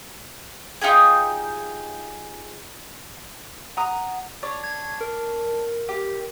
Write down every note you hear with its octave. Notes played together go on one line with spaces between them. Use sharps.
D#4 F4 G4 G#4
F#5 A#5 D#6
D4 C#5
G#6
A#4
G4